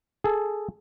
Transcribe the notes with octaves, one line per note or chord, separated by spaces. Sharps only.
G#4 A4